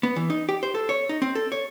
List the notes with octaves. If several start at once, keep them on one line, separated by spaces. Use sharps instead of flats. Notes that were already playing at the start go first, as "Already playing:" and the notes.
B3
E3
D#4
G4
C5
A4
C#5
D#4
C4
A4
C#5